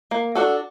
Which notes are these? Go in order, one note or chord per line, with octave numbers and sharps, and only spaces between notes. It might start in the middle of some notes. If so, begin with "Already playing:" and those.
A#3
D4 F#4 A4